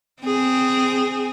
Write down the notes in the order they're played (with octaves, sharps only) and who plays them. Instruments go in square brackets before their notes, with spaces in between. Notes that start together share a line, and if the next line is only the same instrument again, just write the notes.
[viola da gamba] C4 G#4